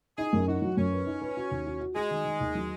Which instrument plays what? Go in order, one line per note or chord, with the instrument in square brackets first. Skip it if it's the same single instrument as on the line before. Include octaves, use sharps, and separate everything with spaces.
[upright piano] D#4 [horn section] G#4
[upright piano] F#2
[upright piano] D#4 [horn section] F#4
[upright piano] F#3
[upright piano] F#2 [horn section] C#4
[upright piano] B4
D#4
B4
F#4
D#2
F#4
F#4
[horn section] G#3 [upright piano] F#4
[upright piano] D#3
D#3
D#2
F#3